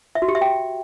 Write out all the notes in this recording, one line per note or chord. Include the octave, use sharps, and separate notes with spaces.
E5
F#4
G4
E5
G5